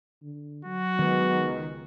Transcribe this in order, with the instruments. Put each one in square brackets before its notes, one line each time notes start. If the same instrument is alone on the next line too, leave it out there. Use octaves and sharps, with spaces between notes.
[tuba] D3
[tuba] F#3 [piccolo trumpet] F#4
[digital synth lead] D#3 [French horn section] G#3 B3
[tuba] C#2